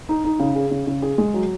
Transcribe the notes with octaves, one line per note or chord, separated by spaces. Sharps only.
D#4
D#4
C#3
G#4
C#3
C#3
G#4
G#3
F#3